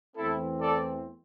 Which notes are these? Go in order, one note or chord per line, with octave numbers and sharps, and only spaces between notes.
E2 E3 A3 C4 E4 A4
A4 D5